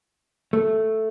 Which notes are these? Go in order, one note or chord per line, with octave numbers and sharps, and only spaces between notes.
A3